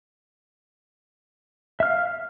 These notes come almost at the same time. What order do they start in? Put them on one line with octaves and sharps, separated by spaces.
E5 F6 F5